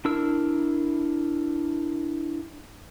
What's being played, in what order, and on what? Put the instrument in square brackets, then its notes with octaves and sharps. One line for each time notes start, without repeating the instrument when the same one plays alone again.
[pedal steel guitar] D4 E4 A#4 E6